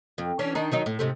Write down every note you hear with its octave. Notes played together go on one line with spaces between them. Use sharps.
F2
E3 C#4 D4
D#3 D4 D#4
D#3 F#3 D#4
A2
G#2 C3 A3